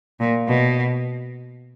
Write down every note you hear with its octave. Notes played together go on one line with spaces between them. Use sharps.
A#2
B2